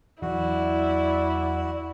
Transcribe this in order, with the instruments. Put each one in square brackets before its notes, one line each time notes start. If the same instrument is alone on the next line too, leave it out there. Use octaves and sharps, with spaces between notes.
[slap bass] E2 E3 F#3 [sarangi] E4 [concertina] F#4 [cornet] D5